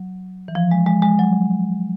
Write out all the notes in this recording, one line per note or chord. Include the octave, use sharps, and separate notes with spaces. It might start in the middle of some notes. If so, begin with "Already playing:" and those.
Already playing: F#3
E3
F3
G#3
G#3
G#3
F#3